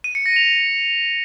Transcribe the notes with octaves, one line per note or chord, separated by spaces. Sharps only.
D#7
C#7
A#6
F7